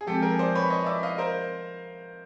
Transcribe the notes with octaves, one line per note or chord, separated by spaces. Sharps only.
G#4
F3 G#3 C4 G4 A4
G#4 A#4
C5 D5
B4 C#5
C#5 D#5
D5 E5
D#5 F5
A#4 C5